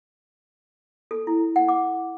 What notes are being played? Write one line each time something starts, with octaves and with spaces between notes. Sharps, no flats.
A4
E4
F#5
D6